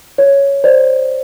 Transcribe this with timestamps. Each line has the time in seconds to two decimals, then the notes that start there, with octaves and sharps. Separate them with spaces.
0.18 C#5
0.64 C5 D5